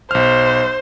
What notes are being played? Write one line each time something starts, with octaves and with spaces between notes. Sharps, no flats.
B1 C5 F6